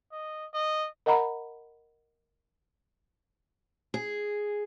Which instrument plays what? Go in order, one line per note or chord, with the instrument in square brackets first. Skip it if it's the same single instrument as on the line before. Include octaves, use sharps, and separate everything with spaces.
[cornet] D#5
D#5
[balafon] A#4 D#5 F#5 A#5 B5
[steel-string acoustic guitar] G#4